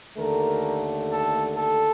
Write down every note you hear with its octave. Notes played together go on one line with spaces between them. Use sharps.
D#2 D3 A3 A#4
A4
A4